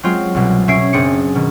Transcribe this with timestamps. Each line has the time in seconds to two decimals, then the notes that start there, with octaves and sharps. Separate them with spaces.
0.03 F#3 G#3 C4 F4
0.35 C2 B2 G#3
0.68 B2 C#4 E5 G#6 C7 D7
0.93 F#1 C4 D4 G#4 C#7
1.35 B2 D#3